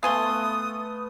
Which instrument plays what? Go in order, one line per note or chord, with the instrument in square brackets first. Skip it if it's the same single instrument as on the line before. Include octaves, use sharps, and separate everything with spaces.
[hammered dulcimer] A3 B3 [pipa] F5 G#5 C6 [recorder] D#6